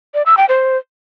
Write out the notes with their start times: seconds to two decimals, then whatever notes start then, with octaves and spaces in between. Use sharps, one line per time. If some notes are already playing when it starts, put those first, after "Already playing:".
0.14 D5
0.26 E6
0.37 G5
0.49 C5